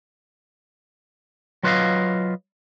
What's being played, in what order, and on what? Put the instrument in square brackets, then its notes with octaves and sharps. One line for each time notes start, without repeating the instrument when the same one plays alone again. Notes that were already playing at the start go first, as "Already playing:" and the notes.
[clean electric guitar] F#3 F4 B4 C#5 D#5 F5